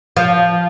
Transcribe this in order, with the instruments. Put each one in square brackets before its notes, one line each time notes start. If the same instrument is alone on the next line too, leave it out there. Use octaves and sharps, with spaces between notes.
[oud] F3